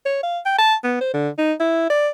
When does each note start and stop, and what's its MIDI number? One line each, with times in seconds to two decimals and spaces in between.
0.06 0.20 73
0.23 0.39 77
0.46 0.56 79
0.59 0.75 81
0.84 0.97 59
1.01 1.13 72
1.14 1.29 50
1.38 1.53 63
1.60 1.89 64
1.90 2.09 74